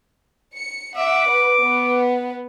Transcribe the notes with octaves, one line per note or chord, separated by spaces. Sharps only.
C#7
E5 F#5 D6
B4
B3 B4